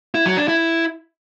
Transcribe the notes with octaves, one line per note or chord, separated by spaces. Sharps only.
E4
F#3
D4
E4